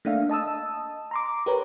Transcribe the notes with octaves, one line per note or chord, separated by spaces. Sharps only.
A3 A#3 D4 E5 F5
D#5 A5 D#6 E6
A#5 C6 D6
G4 A#4 B4 C#5 A#5